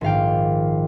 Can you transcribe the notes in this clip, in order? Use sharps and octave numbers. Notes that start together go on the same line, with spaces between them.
A#1 G#2 D#3 F5 G5